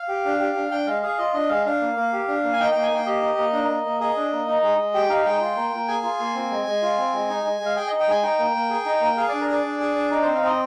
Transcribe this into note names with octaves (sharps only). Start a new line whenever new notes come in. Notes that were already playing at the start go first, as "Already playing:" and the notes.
Already playing: F5
G4
D4
G4
D4
D4 G5
G#3 F5
G#4 F5
F4 D#5
D4 D#5
G#3 F5
D4 F5
A#3
A#3
G4
D4
A#3
G#5
D#4 G5
A#3 G5
G#5
A#3 G5
G4 D#5
D#4
A#3
D4
A#3
A#3
G#4 D#5
D4
A#3
D#4
G#3
G#3
G4 G5
D#4 F5
G#3 G5
F4
A#3
A#3
G#4 G#5
F4
A#3
C4
G#3
G#3
F4
C4
G#3
D#4
G#3
G#3
F5
G#4 G5
D#4 D#5
G5
G#3 G#5
D#4 G5
A#3
A#3
G#4
D#4
A#3
G#4 F5
D4 D5
A#4
G#4 D5
D4
G#4
D4
D#4 D5
C4 C5
F5
C4 D#5